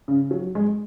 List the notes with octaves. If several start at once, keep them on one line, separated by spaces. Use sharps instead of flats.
C#3
F#3
G#3